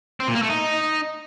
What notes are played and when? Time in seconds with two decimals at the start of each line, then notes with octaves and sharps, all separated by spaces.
0.20 C4
0.27 A#2
0.35 A#3
0.42 A3
0.50 D#4